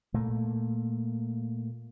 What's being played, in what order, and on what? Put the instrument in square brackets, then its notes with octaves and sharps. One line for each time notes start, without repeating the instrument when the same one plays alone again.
[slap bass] A#2 A3 A#3